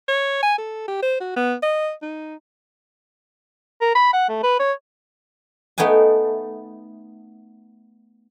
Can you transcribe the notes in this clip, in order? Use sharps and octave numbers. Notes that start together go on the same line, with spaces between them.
C#5
G#5
A4
G4
C5
F#4
B3
D#5
D#4
A#4
B5
F#5
A3
B4
C#5
A3 B3 D#4 G5 G#5